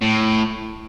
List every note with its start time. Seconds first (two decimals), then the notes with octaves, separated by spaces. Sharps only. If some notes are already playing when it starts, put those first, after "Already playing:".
0.02 A2